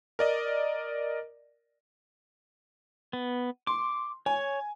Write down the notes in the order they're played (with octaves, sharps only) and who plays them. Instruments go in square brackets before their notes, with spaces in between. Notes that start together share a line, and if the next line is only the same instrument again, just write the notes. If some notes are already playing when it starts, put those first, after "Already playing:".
[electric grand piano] A#4 D5 D#5
[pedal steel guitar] B3
[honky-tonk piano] C6 [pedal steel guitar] D6
[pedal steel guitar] C#5 [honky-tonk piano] G#5